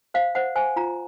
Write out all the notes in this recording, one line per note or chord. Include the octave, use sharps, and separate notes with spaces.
C5 F5
C5 F#5
C5 G#5
F4 A#5